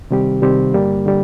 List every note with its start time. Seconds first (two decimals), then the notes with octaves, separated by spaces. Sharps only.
0.11 C3 D#3 G3 C4 G4
0.42 C3 D#3 G3 C4 G4
0.74 G2 D3 G3 A#3
1.06 D3 G3